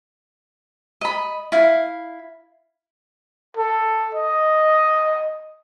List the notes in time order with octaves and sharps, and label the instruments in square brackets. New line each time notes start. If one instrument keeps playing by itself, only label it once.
[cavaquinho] D#5 B5
E4 F5
[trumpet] A4
D#5